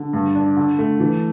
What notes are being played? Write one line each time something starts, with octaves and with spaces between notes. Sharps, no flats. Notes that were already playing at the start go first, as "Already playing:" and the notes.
Already playing: D3
G2
D4
D3
A3
E3